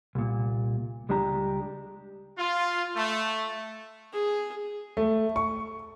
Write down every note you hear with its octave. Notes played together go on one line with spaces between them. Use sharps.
C2 A#2
C#2 G3 G#3 D4 G4 A#5
F4
A3
G#4
A3
C#6